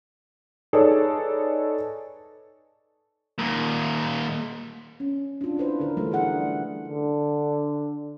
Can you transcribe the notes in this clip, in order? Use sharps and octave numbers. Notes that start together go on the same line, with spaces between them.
D#4 G#4 A4 B4 C#5 D5
D#2 A#2
C#4
D4 F4
D4 E4 B4 C5
D3 A#4
E3 F#3 G3 A3 F4 A4
D4 E4 G#4 F#5
D3